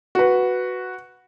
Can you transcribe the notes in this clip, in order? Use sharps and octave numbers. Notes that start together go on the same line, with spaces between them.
F#4 B4